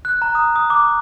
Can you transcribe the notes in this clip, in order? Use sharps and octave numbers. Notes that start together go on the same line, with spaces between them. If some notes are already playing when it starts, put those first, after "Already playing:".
F#6
A#5
D#6
D#6
D6